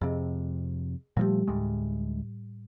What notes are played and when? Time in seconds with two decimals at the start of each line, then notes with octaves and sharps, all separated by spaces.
0.01 F2 C3 G#4 D#5
1.17 A#2 F3 G3 A3 G4
1.48 D2 A2 G3 G#3